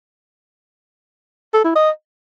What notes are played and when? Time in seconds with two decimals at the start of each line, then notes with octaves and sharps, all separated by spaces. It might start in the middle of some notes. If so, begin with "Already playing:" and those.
1.54 A4
1.64 E4
1.75 D#5